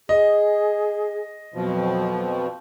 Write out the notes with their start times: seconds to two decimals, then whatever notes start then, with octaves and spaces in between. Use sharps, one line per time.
0.09 G#4 D#5
1.54 F2 B2 F3 F#3